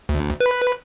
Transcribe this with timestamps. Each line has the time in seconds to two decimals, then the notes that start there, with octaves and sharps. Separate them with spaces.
0.09 D2
0.40 B4